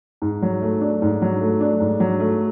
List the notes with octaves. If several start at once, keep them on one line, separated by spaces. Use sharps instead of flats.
G#2
F#3
A3
D4
G#2
F#3
A3
D4
G#2
F#3
A3